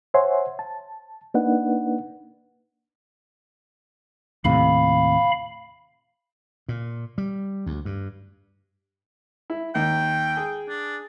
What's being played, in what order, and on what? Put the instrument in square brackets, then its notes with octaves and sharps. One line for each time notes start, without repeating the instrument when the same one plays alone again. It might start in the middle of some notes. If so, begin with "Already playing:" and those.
[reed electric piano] C5 C#5 E5 F#5 G#5 C6
A5
A#3 D4 D#4 B4 F#5
[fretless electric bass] D#2 A2 C3 [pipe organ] F5 B5
[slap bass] A#2
G3
D2
G2
[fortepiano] E4
[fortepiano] D#2 [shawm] G5
[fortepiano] G#4
[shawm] D4